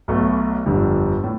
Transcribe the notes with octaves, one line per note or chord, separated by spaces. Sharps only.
B1 B2 A3
G1 F2 D3 G3
A2